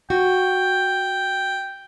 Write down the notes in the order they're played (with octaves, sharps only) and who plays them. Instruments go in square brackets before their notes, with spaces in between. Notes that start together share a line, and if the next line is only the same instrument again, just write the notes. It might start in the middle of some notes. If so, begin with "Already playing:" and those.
[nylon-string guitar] F#4 [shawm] G5